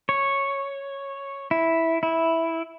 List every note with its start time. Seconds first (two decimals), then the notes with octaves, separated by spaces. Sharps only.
0.09 C#5
1.51 E4
2.03 E4